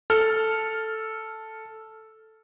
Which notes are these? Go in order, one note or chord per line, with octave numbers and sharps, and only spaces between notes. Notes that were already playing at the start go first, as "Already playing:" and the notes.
A4 F6